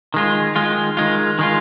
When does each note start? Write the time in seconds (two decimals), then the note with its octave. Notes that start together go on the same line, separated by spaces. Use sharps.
0.14 D#3 G#3 F4
0.56 D#3 G#3 F4
0.97 D#3 G#3 F4
1.39 D#3 G#3 F4